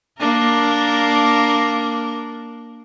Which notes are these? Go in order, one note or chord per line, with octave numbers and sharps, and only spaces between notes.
A#3 D4 A#4